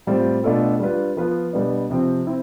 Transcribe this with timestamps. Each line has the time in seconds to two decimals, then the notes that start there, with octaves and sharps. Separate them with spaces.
0.07 A2 G3 C4 F4 C5
0.44 B2 A3 D4 F4 A4
0.80 G3 D4 F4 B4
1.17 F3 B3 F4 B4
1.53 B2 G3 B3 D4
1.90 C3 F3 C4
2.27 C4 E4